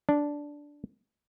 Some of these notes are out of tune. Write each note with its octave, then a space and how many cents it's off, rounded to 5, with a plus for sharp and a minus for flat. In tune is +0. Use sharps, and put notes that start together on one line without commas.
D4 -5